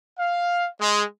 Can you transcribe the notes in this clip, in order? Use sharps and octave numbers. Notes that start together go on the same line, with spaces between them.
F5
G#3